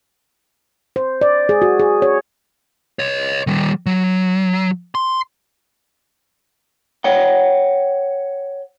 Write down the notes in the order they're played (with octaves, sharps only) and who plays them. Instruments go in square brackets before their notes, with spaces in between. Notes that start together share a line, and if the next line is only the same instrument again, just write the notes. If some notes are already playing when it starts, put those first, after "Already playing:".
[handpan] C5
D5
G#4
F#4
G#4
C#5
[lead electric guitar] C#5 D#5
D#3 G3
F#3
C6
[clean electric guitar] C#5 F#5 G5